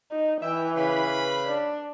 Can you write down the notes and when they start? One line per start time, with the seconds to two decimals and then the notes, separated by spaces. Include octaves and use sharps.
0.12 D#4
0.43 E3 E5 G5
0.76 C#3 B4 B5
1.47 D4